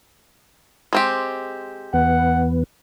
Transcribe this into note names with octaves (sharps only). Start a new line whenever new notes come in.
G#3 C4 G4
E2 B3 F#5